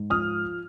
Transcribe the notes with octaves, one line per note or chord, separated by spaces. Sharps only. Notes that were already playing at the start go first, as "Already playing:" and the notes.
Already playing: G#2
F3 D#6 F6